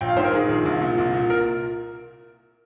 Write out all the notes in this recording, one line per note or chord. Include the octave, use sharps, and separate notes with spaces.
A#1 G5
F5
G#2 C5
A#4
D#3 G#4
A#1
C2
A#2
C2
A#2
A#4